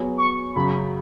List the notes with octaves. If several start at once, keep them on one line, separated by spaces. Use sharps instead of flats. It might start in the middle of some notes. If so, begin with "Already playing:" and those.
Already playing: F#3 B3 G#4 C#5
C#6
F#2 C#3 F#3 B5